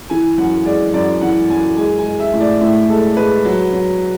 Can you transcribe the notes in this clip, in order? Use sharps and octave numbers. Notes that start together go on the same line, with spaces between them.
E3 G#5
F#2 F#5
G#3 D5
F#2 D5
E3 F#5
F#2 G#5
G#3 G#5
G#5
G#3
E5
A2
D5
A2 E5
G#3 A4
G#3 B4
F#3
F#3